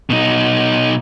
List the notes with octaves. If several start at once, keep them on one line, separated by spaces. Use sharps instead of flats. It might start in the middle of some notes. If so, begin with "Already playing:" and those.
B2 D#4